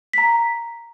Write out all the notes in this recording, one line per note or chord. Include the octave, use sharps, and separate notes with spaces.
A#5 B6